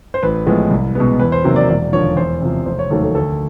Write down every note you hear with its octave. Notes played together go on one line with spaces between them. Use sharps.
C5
A1 B4
A2 F3 G#3 B3
C2
B2 G#3 B3
E2 B4
C5
C3 D#3 F#3 A#3
D5
E1 D5
D#2 D3 F3 C#5
E2 C5
C3 F3
F1 C5
C#5
D#2 D#3 F#3 A3 A4
A4
D2 A4